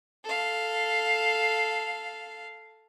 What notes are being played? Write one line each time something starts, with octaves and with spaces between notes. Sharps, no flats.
A4 F5